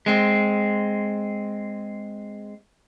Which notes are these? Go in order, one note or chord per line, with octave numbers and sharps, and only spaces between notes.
G#3 C4